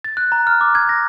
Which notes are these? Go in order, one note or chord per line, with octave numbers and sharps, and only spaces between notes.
A6
F#6
A#5
F6
D6
G#6
A#6